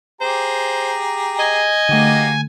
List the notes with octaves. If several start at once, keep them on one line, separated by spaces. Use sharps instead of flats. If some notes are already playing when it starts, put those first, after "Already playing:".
G4 G#4 C5 A#5
D#5 G#5
D3 A3 A#3 F#4 G4